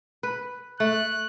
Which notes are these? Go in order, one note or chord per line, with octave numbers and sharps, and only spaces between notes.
B4
A3 F#6